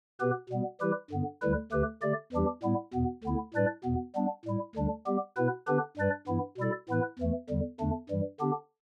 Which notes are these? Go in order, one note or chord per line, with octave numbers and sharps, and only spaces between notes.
B2 B3 G4 B4
B2 G3 B3
E3 G3 E4 G4 B4
G2 D3 B3
D2 D3 G3 E4 B4
D2 D3 A3 G4 B4
D3 A3 G4 D5
E2 E3 G3 D4 G4
A2 G3 B3 E4
E2 B2 B3
D2 D3 B3 E4
A2 G3 D4 B4 D5
E2 B2 B3
G3 B3 D4
A2 G3 E4
D2 D3 G3 D4
G3 B3 G4
B2 B3 E4 B4
D3 B3 D4 G4 B4
G2 G3 D4 B4 D5
G2 E3 B3 E4
B2 G3 E4 A4 D5
A2 E3 B3 E4 B4
E2 E3 A3
E2 D3 G3
E2 D3 A3 D4
G2 E3 G3
D3 B3 D4 G4